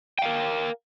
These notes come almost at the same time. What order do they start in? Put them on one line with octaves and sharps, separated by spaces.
G5 F5 A#4